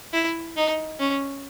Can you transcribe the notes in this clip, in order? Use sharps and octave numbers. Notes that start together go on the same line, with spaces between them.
E4
D#4
C#4